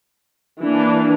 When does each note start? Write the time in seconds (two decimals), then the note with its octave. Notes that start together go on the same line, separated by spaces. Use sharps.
0.63 E3 A#3 D4